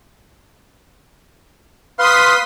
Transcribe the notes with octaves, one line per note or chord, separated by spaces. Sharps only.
B4 F5 C6 D#6 B6